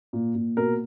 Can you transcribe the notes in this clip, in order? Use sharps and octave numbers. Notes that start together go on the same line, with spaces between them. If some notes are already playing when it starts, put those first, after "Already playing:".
A#2
A#2
B2 A#4